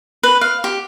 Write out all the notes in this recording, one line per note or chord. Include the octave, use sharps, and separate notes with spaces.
B4
F5
G4